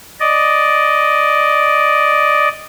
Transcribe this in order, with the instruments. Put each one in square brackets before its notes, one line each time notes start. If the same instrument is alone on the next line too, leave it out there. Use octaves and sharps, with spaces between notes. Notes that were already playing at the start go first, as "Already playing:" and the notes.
[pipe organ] D5 D#5